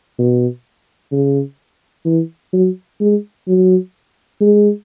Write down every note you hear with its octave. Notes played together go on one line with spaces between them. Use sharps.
B2
C#3
E3
F#3
G#3
F#3
G#3